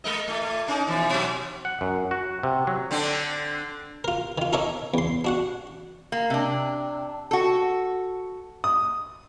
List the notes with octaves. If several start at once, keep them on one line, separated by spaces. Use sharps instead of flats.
G#3 A#4 D#5
A#2 A3
A#2 A3
A#3 C#4 D#4
B2 E3 F3
B2 F#3
F#5
F#2
F#4
C3
F#3
D3 C4 D4
F4 A#4
D#3 F4
D#4 A4 A#4 C#5 E5 D6
E2 C6
D4 F#4 F#5
A#3
C3 D4
F#4 A4
D#6